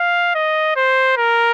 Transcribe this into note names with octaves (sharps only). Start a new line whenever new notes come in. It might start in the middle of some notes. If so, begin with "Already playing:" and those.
Already playing: F5
D#5
C5
A#4